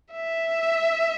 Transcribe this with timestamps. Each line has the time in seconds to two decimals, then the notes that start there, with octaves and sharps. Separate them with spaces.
0.13 E5